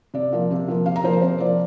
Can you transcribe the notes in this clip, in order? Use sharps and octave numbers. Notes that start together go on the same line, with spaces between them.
C3 D5
F3 A#3
C3
F3 A#3
C3 F5
A#5
F3 A#3 C5
C3 C5
F3 A#3 D5